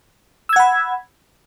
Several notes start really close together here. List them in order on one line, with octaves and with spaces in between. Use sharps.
E6 G#6 F#5 B5